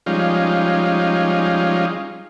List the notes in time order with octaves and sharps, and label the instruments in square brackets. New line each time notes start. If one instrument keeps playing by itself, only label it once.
[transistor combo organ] F3 G3 G#3 C#4 D#4 F4